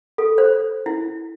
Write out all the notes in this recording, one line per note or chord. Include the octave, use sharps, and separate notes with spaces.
A4
C5
E4